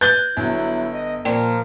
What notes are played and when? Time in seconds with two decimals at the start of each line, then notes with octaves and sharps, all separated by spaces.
0.01 B4 F#6 G6 A6 G7
0.37 G1 F#3 B3 E4
0.93 D#5
1.25 A#2 F3 A#4 D5 G5